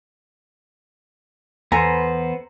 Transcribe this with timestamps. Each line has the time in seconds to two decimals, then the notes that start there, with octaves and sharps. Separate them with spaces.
1.72 E2 B3 A4 B4 C5 G#5 A#5